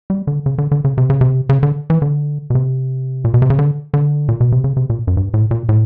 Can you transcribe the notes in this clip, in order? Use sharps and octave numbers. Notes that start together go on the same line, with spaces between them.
G3
D3
C#3
D3
D3
C#3
C3
C#3
C3
C#3
D3
E3
D3
B2
C3
A#2
B2
C3
C#3
D3
D3
A#2
B2
C3
C#3
C3
A#2
F#2
G2
A2
A#2
A2